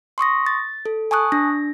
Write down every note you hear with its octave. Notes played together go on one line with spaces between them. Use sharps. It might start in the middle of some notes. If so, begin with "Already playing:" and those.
C6 C#6 D#6 A#6
A6
A4
G#5 A5 C#6 D#6 F#6
D4 A#6